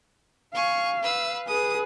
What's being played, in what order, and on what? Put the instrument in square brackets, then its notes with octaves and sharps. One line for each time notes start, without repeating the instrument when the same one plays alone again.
[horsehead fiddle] F5 [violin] G#5 C#6
[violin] B4 E6
[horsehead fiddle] G#4 B4 [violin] D#6